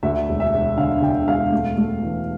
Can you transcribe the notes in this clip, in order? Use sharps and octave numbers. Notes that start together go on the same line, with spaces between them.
D2 E5
E1
E5
E1
D3 F5
D3 G5
E1 F5
A3
A3
E3